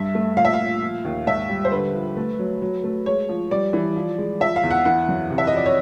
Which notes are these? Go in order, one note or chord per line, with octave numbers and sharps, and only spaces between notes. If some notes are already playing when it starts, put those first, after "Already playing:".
Already playing: G2 E5
A3
A#2 F5
E5
F5
A#2
F3
D#2
G#2 E5
G3
C5
D3 B4
F3
A3
F#3
F#3
A3
G#3 C#5
F3
G3 D5
E3
F3
G#3
F3 E5
F5
E2
F#5
E3 F#5
F#2
C3
E5
D#5
F2 D5
C#5